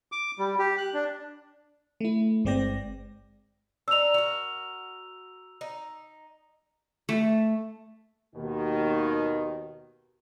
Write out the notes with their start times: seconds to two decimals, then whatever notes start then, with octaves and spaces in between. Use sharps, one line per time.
0.12 D6
0.39 G3
0.59 G4
0.78 F#6
0.94 D4
2.00 A3 E4
2.45 G1 G#3 C4 D5 G5 A#6
3.88 D4 D#4 E6 F7
4.14 F#4 A#4
5.61 D#4
7.09 A3
8.35 D#2 B2 D#3